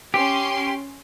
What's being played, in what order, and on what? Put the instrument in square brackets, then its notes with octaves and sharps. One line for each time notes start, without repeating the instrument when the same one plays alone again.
[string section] C#4 C6 [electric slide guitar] G4